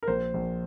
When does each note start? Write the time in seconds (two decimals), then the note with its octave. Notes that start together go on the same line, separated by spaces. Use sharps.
0.03 A#4
0.07 A#1 C5
0.34 A#1